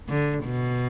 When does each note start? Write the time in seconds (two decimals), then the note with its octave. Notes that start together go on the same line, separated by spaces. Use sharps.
0.09 D3
0.44 B2